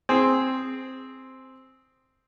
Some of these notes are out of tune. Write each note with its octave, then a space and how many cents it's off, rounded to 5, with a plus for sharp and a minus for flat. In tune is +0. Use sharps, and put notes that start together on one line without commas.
C4 +0 G#4 +0